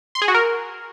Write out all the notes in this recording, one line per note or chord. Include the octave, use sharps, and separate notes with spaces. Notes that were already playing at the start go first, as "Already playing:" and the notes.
C6
G#4
F#4
A#4